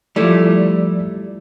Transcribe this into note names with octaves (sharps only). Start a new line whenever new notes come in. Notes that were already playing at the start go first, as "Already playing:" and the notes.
F3 G3 A3 E4 D5